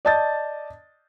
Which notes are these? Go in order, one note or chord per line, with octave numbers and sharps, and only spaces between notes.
D5 D#5 A5 G6 A6